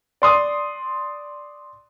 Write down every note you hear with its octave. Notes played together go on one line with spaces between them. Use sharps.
D5 C6 D#6